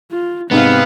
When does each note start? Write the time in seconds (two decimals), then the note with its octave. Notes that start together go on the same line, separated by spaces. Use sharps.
0.12 F4
0.51 G#2 C3 B3 C4 F5